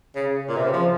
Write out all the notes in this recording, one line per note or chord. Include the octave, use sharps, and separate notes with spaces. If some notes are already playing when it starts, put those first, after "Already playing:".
C#3
A#2
C3
C#3
F3